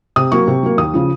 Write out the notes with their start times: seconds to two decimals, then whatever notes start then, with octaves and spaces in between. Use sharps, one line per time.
0.16 C3 D#6
0.32 F#3 A#3 C#6
0.48 C3
0.63 F#3 A#3
0.78 D#2 D#6
0.94 C#3 F3